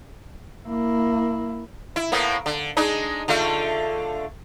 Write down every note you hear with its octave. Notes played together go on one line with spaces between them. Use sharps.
A#3 E4
E4
A2 A#3 B3
D3
G#3 D4 D#4
D3 A3 F4